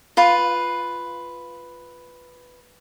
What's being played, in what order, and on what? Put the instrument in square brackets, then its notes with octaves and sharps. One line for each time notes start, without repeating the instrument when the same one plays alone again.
[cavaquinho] F4 B4